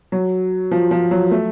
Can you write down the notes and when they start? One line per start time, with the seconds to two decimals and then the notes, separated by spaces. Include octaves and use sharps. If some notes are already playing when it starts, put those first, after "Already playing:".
0.12 F#3
0.71 F3
0.91 F3
1.11 F#3
1.31 A3